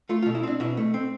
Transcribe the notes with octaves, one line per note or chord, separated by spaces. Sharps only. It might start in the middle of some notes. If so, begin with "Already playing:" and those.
A3 F4
F4
B2
E4
C4 D4
B2 E4
A3
C4